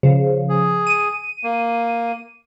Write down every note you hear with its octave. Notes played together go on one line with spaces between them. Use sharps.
C#3 F3
G#4
D#7
A#3